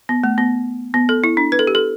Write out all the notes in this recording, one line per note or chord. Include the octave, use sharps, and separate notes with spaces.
B3
A3
B3
B3
A4
E4
D4
B4
A4
G4
A4